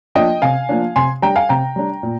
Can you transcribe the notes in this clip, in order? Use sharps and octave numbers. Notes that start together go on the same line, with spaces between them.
F3 A#3 D4 D#5 G5
C3 F5 G#5
F3 A#3 D4
C3 G#5 C6
G3 D4 G5 A#5
F5 G#5
C3 G5 A#5
G3 D4
A#2